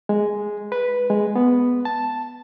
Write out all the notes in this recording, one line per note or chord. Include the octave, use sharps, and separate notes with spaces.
G#3
B4
G#3
B3
A5